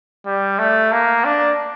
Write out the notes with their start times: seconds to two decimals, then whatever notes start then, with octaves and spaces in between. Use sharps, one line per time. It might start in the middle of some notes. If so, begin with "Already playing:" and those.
0.26 G3
0.59 A3
0.92 A#3
1.24 D4